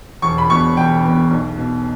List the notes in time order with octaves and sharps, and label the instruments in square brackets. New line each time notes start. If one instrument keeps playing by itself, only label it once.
[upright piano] E1 C#6
B5
E2 B2 C#6
E1 G5
E2 B2
B1
B2